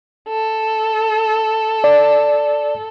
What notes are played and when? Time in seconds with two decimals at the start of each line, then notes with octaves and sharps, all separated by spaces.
0.29 A4
1.84 D5